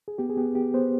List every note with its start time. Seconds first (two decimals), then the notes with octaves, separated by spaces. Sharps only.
0.08 G#4
0.18 B3 G4
0.30 G#4
0.37 B3 G4
0.55 B3 G4
0.74 B3 C5